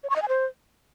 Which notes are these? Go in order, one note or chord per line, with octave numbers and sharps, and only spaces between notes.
C#5
C#6
D#5
G#5
C5